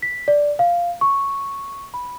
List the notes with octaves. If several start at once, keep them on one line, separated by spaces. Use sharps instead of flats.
B6
D5
F5
C#6
B5